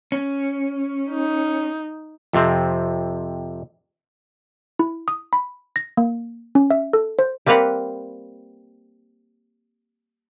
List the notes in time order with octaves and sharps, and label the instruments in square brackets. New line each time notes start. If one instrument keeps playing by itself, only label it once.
[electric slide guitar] C#4
[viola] D#4
[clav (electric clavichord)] F2 C3 C4
[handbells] E4
D#6
B5
A#6
A#3
C#4
E5
A4
C5
[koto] G3 A#3 C4 B4 F5 F#5